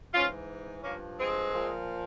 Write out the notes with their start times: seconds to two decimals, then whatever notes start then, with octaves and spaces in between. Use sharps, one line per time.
0.13 G#2 E3 C#4 F4
0.83 G2 F3 A#3 C#4
1.18 G#3 C4
1.52 A#2 F3